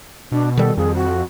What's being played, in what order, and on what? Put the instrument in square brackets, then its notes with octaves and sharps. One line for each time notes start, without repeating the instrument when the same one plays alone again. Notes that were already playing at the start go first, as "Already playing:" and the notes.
[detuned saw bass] B2 [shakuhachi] D4
[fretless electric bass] D#3 G3 [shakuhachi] A4
[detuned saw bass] F2 [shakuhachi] G#4
[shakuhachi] F#4